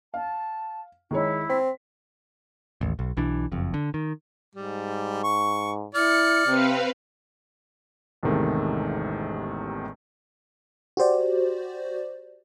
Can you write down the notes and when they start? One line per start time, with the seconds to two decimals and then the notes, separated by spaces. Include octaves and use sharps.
0.14 F5 A5
1.11 D#3 G#3 E4 C#5
1.49 C4 B6
2.81 A1 D#2
2.99 B1
3.17 B1 E3 D4
3.52 F#1 F2
3.74 D3
3.94 D#3
4.56 G#2 G3
5.24 C#6
5.95 E4 D5 F6 C#7
6.46 C3 C4 B4 F5
8.23 A1 E2 C3 D#3 G#3 A3
10.97 F#4 G4 C5 D5